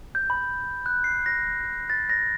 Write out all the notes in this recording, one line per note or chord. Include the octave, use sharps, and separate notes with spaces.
G6
B5
F#6
C7
A#6
A6
A#6